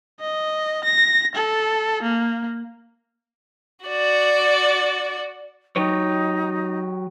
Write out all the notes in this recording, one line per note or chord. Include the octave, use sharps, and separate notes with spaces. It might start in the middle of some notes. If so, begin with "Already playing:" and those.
D#5
A#6
A4
A#3
F#4 D5
F#3 D#4 G4 C#5